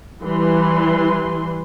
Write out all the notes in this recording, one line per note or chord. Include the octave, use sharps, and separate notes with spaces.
E3 G3 B4 C6